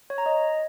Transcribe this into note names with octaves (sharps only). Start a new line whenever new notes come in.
C#5
A#5
D#5